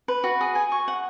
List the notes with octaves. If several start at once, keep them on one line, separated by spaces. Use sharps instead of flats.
B4
F#4
G#4
G#5
C#6
F#5